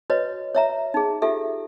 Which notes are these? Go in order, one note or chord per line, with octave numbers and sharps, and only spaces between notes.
F#4 B4 C#5 D#5
C#5 E5 A#5
D#4 G#4
F4 G4 A4 E5